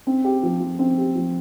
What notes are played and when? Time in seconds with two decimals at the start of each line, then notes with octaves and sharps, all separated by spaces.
0.07 C4
0.24 G4
0.43 F3
0.60 F3
0.79 C4
0.98 G4
1.15 F3